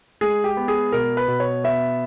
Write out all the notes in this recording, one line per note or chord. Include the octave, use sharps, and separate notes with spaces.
G#3 G#4
G4
B3
G#4
B2 A#4
B4
B2
C#5
B3 E5